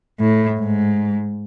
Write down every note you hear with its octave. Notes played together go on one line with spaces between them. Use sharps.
A2
G#2